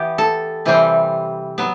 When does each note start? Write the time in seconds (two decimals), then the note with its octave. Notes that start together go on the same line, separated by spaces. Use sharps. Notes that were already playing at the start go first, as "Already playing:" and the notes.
Already playing: E3 B3 G4
0.18 A4
0.65 C3 E3 G3 C4
1.58 F#3 B3